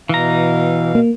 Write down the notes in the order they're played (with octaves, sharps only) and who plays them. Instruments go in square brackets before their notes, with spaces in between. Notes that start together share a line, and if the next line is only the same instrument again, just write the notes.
[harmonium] B2 F5 [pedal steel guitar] E3 A#5
[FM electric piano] A#3